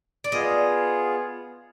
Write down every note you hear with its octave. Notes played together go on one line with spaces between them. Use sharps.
D5
B3 F4 G#4 D#5